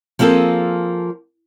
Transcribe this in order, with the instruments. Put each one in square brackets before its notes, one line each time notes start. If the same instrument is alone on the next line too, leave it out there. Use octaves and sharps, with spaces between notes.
[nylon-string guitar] F3 A#3 C4 G#4 A4